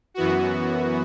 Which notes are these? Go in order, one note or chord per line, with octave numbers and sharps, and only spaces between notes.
F#2 E3 B3 F#4